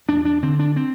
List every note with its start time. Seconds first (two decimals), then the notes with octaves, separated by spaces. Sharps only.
0.08 E2 D4
0.25 D4
0.42 D3 C4
0.59 D4
0.76 C4